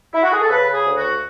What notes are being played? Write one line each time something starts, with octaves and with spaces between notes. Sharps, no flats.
E4
F#4
G#4
A4
C#3 B4
G#4
D2
F#4